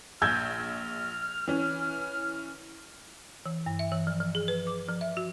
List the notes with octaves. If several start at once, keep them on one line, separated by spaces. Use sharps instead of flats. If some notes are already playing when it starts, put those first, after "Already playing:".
A#1 E6 F6 G6 G#6
E3 C#4
E3
G2
E5
E3
F3
F3
G#4
B4
D6
F3
E5
F#4